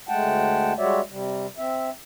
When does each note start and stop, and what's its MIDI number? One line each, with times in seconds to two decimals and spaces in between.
0.09 0.73 38
0.09 0.73 56
0.09 0.73 57
0.09 0.73 78
0.09 0.73 79
0.09 0.73 81
0.78 1.01 55
0.78 1.01 56
0.78 1.01 66
0.78 1.01 73
0.78 1.01 74
0.78 1.01 76
1.10 1.46 48
1.10 1.46 55
1.58 1.90 60
1.58 1.90 76